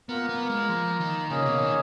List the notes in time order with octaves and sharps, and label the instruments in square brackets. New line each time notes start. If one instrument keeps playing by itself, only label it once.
[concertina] A#3 F4 A#4 [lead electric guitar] B3
[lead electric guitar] B3
G#3
F3
D#3
[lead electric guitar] C#3 [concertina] A#3 C#4 G#4 D#5
[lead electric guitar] B2
D#3